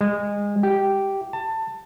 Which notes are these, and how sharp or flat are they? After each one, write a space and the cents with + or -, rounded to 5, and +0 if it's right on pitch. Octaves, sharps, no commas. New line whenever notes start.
G#3 -25
G4 -10
A5 +20